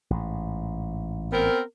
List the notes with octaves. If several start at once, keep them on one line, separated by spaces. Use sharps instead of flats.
A1 G#2
B3 C4 A#4